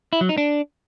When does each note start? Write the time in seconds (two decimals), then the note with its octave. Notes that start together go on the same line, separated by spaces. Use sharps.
0.13 E4
0.21 F#3
0.29 D#4
0.38 D4